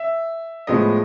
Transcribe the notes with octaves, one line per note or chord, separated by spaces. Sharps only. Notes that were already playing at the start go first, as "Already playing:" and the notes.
Already playing: E5
A2 F3 G#3 B3 D#5